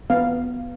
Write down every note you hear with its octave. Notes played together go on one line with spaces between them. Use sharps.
B3 F5